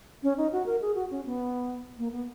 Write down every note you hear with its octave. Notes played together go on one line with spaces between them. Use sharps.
C#4
D#4
F#4
A#4
G#4
F#4
C#4
B3
A#3
B3